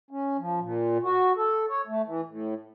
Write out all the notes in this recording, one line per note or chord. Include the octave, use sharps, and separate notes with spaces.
C#4
F3
A#2
F#4
A4
C#5
A3
E3
A2